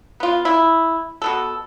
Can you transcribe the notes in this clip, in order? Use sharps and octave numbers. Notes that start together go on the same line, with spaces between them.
B3 F4
E4
B2 B3 A4